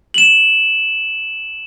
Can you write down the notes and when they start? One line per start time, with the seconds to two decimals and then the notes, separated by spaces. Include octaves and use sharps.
0.14 E7 F#7